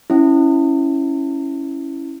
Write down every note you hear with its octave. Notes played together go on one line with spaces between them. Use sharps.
C#4 E4